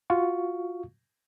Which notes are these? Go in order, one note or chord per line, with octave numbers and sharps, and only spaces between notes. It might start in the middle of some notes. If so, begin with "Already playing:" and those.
F4 F#4 F5 C#6